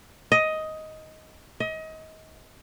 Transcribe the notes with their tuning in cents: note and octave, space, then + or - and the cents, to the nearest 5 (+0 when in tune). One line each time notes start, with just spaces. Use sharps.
D#5 +10
D#5 +30